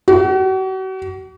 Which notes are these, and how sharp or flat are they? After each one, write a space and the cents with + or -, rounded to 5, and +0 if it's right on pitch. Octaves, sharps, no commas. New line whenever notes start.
F#4 +40